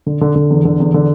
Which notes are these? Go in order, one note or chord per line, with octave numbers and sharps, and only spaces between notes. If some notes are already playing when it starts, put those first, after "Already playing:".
D3
D3
D3
E2
D3
E2
D3